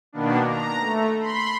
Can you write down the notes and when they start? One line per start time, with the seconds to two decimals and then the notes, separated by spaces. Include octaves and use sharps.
0.13 B2 D#3 A#3 B3 D4
0.47 A#5
0.80 A3
1.19 B5 C6